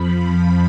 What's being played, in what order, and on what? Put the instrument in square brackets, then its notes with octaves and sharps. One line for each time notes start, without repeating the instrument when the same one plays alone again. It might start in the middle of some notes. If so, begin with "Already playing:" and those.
Already playing: [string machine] F2 F3 B5
B5